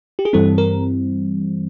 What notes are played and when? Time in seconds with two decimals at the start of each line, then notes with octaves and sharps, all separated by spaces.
0.19 G4
0.25 G#4
0.33 G2 E3 G3 C4 A4
0.58 A#4